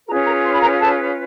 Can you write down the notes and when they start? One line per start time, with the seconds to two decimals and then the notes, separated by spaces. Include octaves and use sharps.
0.07 C#4 F4 G#4 A#4 B4 A#5
0.25 A#4 A#5
0.46 C6
0.53 B5
0.60 A#4 A#5
0.78 A4 A5